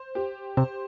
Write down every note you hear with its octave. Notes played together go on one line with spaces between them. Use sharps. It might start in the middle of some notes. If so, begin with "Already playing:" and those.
Already playing: C5
G4
C3 C5